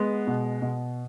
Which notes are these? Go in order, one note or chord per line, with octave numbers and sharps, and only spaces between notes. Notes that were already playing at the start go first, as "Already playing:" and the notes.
Already playing: G#3 B3
B2
B2